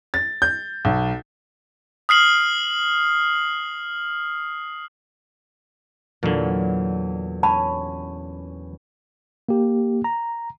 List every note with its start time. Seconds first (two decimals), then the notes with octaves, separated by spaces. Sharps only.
0.14 A6
0.42 G6
0.85 B1
2.09 D#6 F6 C7 F#7
6.23 E2 A#2 D3 F#3
7.43 C#4 A5 B5
9.49 A#3 G4
10.04 A#5